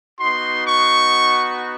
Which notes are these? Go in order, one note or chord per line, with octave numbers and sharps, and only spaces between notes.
B3 D#4 F#4 C6
C#6